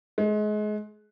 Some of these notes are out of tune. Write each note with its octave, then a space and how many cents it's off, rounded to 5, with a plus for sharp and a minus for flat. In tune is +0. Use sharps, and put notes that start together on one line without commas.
G#3 +30